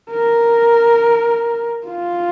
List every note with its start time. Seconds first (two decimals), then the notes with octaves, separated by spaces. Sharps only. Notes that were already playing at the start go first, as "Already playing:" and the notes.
0.10 A#4
1.87 F4